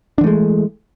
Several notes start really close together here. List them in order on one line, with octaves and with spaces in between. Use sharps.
D4 E3 A3 G#3